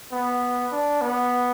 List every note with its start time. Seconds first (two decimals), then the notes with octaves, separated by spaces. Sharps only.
0.12 B3
0.72 D4
1.01 B3